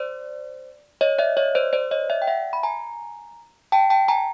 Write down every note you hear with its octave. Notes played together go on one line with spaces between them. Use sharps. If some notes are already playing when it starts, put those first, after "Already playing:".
Already playing: C5 D5
C#5 D#5
D5 E5
C#5 D#5
C5 D5
C5 D5
C#5 D#5
D5 E5
G5
E5 F#5
B5
G#5 A#5
G5 A5
G5 A5
G#5 A#5